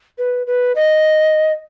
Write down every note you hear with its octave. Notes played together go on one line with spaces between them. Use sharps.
B4
B4
D#5